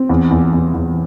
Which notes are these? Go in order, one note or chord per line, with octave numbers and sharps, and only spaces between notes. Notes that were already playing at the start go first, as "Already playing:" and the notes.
Already playing: C4
E2
E2
E2
E2